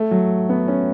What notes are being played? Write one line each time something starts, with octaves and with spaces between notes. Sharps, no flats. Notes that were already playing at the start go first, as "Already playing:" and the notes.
Already playing: A3
F#3
B3
C#4